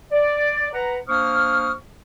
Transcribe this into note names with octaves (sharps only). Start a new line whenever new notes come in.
D5
B4 F#5 A#5
A#3 D4 C5 C#6 D#6 F6